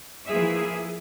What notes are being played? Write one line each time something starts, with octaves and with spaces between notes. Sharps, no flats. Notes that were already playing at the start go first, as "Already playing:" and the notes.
E3 F3 A#3 G#4 E5